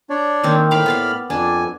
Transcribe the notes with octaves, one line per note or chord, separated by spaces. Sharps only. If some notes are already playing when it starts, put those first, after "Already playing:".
D4 C#5 D5
D#3 A#3 C4
A2 F5 B5 D6 F6
B3 D5 F5
F2 D4 G#5